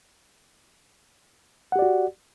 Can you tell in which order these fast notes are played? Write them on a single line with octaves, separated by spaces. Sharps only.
F#5 G4 D5 F#4